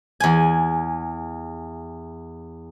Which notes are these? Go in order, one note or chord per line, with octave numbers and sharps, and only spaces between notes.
E2 G#5